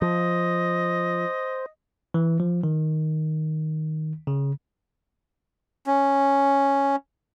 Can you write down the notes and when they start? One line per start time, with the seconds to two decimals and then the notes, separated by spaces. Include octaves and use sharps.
0.02 F3 C5 D#5
2.14 E3
2.40 F3
2.64 D#3
4.27 C#3
5.87 C#4